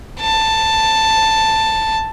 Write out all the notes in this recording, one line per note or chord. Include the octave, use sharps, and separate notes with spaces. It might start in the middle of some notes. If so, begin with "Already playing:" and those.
A5